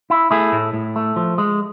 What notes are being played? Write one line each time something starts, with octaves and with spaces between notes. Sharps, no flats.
E4
A3 E4 G#4
A2
A2
A3
F3
G#3